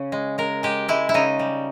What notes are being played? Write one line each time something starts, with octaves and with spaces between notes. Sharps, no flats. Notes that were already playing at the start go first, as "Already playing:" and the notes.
Already playing: C#3 C#4
G#3
G#3 A#4
G#3 G4
G#3 E4
E4
C#3 D#4
G3